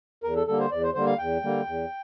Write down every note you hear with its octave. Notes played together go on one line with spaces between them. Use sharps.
E2 A#4
A4
D3 G3 A#3 A4
C5
E2 D5
C5
D3 G3 A#3 C5
F5
E2 G5
D3 G3 A#3
E2